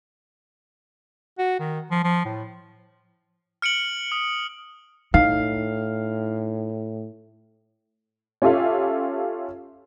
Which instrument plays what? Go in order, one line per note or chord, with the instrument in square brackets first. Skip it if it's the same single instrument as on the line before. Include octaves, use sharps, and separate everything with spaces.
[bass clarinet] F#4
D#3
F3
F3
A2
[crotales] F6 C#7 D7 F#7
D#6
[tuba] A2 [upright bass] D#4 [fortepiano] F5
[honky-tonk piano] C#4 F4 G4 A4 E5 F5